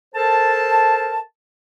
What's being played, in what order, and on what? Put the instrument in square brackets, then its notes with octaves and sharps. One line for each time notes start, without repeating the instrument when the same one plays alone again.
[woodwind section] A4 A#4 C5 A5